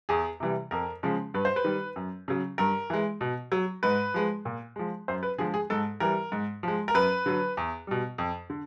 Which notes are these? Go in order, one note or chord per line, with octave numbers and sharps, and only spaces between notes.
E2 G#4
C3 E3 G3
F2 A#4
C#3 F3 G#3
G2 B4
C5
B4
D#3 G3
F#2
C#3 F#3
G2 A#4
E3 G#3
B2
F#3
G#2 B4
F3 G#3
A#2
F3 G#3
F#2 C5
B4
D3 F3 G#3 G#4
G#4
G#2 A4
E3 G3 A#4
G#2
F3 G#3
A#4
F#2 B4
D3 F#3
E2
B2 G3
F2
D3